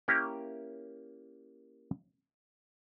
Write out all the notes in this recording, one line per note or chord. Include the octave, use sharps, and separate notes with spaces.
A#3 C#4 E4 G4 A#4 G5